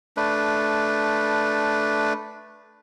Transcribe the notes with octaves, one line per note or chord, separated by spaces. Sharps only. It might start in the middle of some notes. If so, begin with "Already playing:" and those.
A3 D4 B4